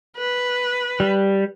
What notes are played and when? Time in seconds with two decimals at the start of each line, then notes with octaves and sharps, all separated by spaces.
0.17 B4
1.00 G3